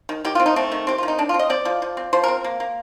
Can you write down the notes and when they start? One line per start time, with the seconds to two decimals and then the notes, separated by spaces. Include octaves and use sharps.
0.09 D#3
0.25 D#3 G4
0.35 C4 F4
0.46 D#4
0.56 A3 C4
0.72 D#3
0.87 C4 G4
0.98 F4
1.03 D#3
1.08 D#4
1.18 C4 D4
1.29 F4
1.34 C4
1.39 D#5
1.50 C4 D5
1.65 F3
1.82 F3
1.97 C4
2.13 F3 C5
2.24 C4 A#4
2.44 A#3
2.60 A#3